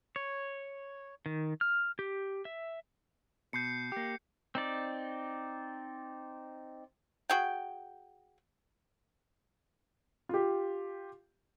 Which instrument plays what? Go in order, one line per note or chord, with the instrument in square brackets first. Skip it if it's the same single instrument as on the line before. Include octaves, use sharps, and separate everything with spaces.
[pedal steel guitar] C#5
D#3
F6
G4
E5
[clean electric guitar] B2 [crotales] G6 C7 C#7
[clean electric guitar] A#3 G4
[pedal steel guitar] C4 D#4 D5
[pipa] F#4 G#4 G5
[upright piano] F4 G4